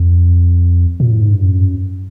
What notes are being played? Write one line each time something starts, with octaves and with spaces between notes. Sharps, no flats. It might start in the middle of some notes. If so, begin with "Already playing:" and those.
Already playing: F2
A#2
A2
G#2
G2
F#2